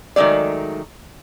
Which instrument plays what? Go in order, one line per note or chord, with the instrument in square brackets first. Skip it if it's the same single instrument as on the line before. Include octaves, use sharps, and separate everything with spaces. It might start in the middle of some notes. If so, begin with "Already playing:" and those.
[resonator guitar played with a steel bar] D#3 F#3 G#3 A3 D5